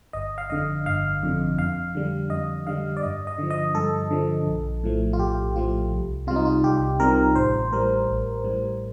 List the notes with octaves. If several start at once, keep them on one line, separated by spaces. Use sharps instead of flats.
G1 D#5
F5
F2 D3 D#5
G1 F5
F2 D3
F2 F5
D3 G3
F2 D#5
D3 G3 F5
D5
G2 D#5
D#5
D3 F3
D#5
G2 A4
D3 F3
A#1
A2 F3 A3
F4
A#1 G4
A2 F3 A3 F4
C2
C3 G3 F4
D#4
F4
C2 G4
C3 G3 A#4
A1 C5
A2 G3 A#4
A1
A2 G3